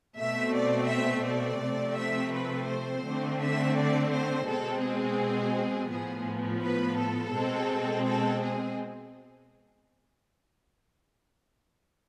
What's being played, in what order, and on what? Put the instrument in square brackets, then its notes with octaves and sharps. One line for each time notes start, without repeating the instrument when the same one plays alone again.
[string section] B2 A3 C4 E5
D5
E5
D5
C3 F3 A3 C4
E5
B4
C5
D3 A3 C4
E5
D5
C5
B2 G#3 C4 A4
G#4
A2 F3 B3 G#4
B4
A4
B2 G#3 C4
A4
G#4